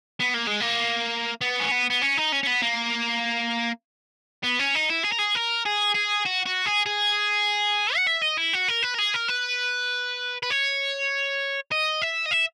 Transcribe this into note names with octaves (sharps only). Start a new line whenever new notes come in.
B3
A#3
G#3
A#3
B3
C#4
B3
B3
C#4
D#4
C#4
C#4
B3
A#3
B3
C#4
D#4
E4
G#4
A#4
G#4
A#4
G#4
G#4
F#4
F#4
G#4
G#4
F#5
E5
D#5
E4
F#4
A#4
B4
A#4
G#4
A#4
B4
B4
C#5
D#5
E5
D#5
E5